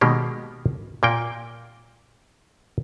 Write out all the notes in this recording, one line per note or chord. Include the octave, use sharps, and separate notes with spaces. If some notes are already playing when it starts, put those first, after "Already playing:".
B2 D#3 G#3 A#3 G4
A#2 A#3 G5